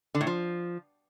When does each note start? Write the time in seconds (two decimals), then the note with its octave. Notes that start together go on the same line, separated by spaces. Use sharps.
0.15 D3
0.21 A2
0.27 F3